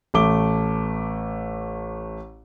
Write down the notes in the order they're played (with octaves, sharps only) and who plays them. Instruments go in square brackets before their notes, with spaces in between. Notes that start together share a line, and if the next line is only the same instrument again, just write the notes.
[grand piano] A1 A3 D6 G7